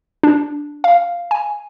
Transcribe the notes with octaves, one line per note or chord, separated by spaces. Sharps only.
D4
F5
G#5